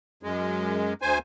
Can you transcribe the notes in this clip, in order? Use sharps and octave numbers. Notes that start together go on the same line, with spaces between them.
F#2 G#3
D2 C5 G#5